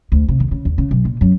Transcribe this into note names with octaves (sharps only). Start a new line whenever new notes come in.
D2
C3
D#2
C#3
D#2
C#3
B1
A#2
F#2